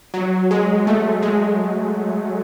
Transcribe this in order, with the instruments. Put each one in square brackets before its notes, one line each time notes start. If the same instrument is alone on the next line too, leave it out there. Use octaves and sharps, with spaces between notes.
[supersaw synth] F#3
G#3
A3
G#3